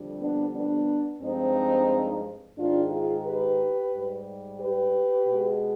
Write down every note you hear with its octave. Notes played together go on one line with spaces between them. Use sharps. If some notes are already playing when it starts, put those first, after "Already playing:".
Already playing: F2 D3 G3
B3 D4
B3 D4
G2 F3 G#3 C4 D#4
G#2 D#3 G#3 D4 F4
F4 G#4
G4 B4
G#2 G3
G4 B4
B2 G#3